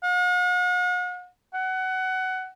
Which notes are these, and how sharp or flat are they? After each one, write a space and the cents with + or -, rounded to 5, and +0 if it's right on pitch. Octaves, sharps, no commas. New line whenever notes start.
F#5 -45
F#5 +20